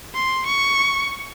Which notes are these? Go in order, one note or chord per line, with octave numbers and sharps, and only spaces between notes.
C6
C#6